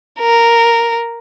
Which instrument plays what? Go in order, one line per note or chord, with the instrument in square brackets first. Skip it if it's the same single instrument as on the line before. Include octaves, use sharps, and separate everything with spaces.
[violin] A#4